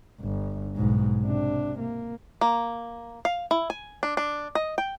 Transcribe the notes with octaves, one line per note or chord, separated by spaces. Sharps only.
G1
B1 G#2
C3 D4
A#3
A#3
F5
E4
G#5
D4
D4
D#5
G5